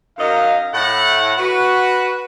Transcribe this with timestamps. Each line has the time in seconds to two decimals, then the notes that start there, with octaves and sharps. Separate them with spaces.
0.18 F#2 D#4 D#5 F5
0.74 A2 E4 F#5
1.38 F#4 B4